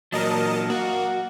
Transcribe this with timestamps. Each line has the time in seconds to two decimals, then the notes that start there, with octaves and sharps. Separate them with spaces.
0.12 A#2 F#3 A#4 D#5 A5
0.70 A#3 F#4